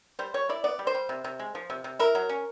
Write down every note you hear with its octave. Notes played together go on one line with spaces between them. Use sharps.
G3 C5
G3 C#5
E4 D5
B3 D5
G3
C5
G3
C3
C3
G#3
F3
C3
C3
E4 A#4
F#3
C#4